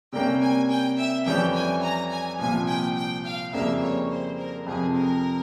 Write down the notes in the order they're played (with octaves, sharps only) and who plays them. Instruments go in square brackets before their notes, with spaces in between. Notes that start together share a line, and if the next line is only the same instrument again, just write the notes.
[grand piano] C3 G3 A#3 C#4 [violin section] G5
[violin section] G#5
G5
E5
[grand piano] F2 E3 G3 C#4 [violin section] G5
[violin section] G#5
A#5
G#5
[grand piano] C2 A#2 F3 [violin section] G#5
[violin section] G5
G5
F5
[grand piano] F2 C#3 G3 A#3 [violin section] E5
[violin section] C#5
C5
A#4
[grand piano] F2 C3 F3 [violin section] G#4
[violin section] A#4